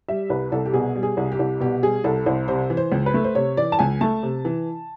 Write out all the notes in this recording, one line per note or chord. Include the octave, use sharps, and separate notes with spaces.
G3 E5
C2 B4
C2 A4
G4
B2 G#4
G3
G#4
C2
G4
C2
B2 G4
G3 G#4
C2 A4
C2 C5
C3 C5
E3
C5
C#2
B4
A3
C5
C3 C#5
E3 D5
A5
C#2 G#5
A3 A5
C3
E3